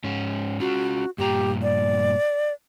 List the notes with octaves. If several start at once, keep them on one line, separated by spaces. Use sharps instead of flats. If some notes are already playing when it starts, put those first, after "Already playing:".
G#2 C#4
C#4 F4 F#4
G2 A#2 G4 A#5
D5